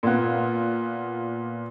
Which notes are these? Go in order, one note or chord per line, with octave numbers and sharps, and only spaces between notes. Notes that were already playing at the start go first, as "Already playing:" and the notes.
A#2 B3